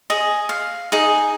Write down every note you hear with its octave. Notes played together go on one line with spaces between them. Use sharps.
G#4 D#5
F5
D#4 G#4